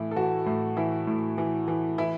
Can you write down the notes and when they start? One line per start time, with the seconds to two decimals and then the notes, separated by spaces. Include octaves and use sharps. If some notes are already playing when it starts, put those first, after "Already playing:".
Already playing: A2 E3 E4
0.11 A4
0.16 E3 F#4
0.46 A2
0.77 E3 E4
1.07 A2
1.38 E3
1.68 E3
1.98 E3 E4